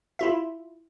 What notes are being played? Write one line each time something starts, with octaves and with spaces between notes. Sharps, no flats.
E4 F4 E5